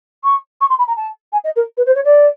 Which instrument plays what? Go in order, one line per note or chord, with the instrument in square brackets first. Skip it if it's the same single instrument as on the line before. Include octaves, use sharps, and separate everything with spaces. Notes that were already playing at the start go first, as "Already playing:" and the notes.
[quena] C#6
C#6
C6
B5
A#5
A5
G#5
D#5
A#4
B4
C5
C#5
D5